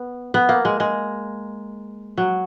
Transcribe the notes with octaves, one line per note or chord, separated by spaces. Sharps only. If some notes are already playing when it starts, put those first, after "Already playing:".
Already playing: B3
B3
A#3
G#3
G#3
F#3